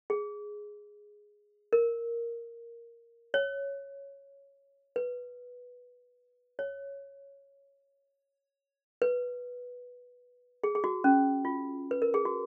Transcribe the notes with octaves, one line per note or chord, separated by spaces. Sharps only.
G#4
A#4
C#5
B4
C#5
B4
G#4
G#4
F#4
C#4
F4
B4
A#4
G#4
F#4